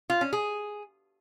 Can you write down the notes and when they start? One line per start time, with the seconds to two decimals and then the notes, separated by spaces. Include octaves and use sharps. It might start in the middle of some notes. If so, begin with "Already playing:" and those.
0.10 F4
0.21 C#4
0.33 G#4